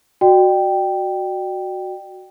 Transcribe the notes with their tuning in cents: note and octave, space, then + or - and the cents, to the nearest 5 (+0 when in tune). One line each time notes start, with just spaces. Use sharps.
F#4 +0 D5 +40 G5 +0